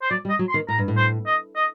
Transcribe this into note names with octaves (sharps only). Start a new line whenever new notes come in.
C5
F#3 D5
G3
D#5
F#3
C6
D#3
A2 A#5
G2
A2
C5
D#5
D#5